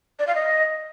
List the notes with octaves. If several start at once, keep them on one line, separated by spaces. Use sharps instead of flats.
D5
F5
D#5